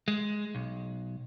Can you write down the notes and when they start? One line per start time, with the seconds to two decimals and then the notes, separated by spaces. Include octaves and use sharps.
0.08 G#3
0.55 B1